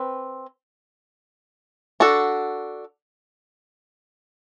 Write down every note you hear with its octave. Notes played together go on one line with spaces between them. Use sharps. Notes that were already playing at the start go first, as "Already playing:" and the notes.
Already playing: C4 B4
D4 F#4 A4